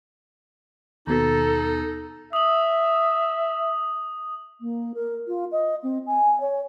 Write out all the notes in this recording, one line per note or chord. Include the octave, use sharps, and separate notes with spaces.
D#2 B2 D#4 A4
E5 D#6 F#7
A#3
A#4
F4
D#5
C4
G#5
C#5